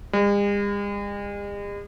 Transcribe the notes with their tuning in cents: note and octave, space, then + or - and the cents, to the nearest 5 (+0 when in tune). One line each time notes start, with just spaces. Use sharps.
G#3 -45